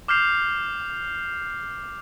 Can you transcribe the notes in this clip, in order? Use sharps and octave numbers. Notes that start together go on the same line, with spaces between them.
D6 F6 G6 C7 F7